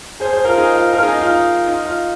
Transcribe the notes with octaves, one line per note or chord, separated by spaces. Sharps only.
G#4 C5
G#4 C5
F4 A#4
D#4 G#4
F4
F4 A#4
D#4 G#4
D#4
F4
D#4
D#4
F4